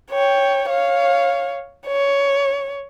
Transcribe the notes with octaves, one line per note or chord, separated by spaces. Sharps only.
C#5 G5
C#5 F5
C#5